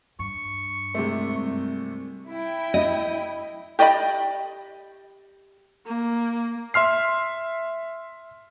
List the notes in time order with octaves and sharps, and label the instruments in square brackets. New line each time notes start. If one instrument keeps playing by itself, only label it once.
[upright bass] G2 [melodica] C#6
[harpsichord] C2 [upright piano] C3 G#3 A3
[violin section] E4 G5
[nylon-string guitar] D#5
[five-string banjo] G4 D5 D#5 G5 B5
[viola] A#3
[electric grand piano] E5 C6 F6 C7